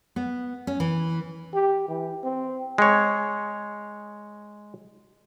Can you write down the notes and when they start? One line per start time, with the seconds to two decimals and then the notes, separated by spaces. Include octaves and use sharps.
0.16 B3
0.67 C#4
0.80 E3
1.54 G4
1.88 E3
2.24 C4
2.78 G#3 C#5